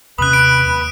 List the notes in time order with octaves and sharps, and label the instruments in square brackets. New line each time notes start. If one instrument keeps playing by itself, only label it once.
[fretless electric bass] D#2 C3 C#4 [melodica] B4 B5 [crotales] D#6 F#6
[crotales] D7
[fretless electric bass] D#2